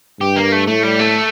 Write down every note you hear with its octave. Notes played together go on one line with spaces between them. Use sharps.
G2 G4
A#3
A3
A2 A3
G3
A3